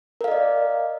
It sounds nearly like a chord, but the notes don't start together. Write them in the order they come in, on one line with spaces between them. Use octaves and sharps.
A#4 F5 D#5 D5